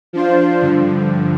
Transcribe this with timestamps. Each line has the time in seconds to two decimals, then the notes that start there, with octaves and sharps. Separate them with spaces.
0.13 F3 D4 F4 C5
0.62 G2 D3 F3